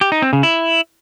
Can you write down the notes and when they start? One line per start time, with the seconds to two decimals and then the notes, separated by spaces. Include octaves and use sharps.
0.01 G4
0.12 D#4
0.22 C4
0.33 C#3
0.43 E4